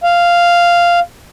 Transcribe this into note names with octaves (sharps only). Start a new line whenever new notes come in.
F5